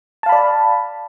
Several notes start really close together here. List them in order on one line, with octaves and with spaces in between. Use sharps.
A5 F5 B5 D5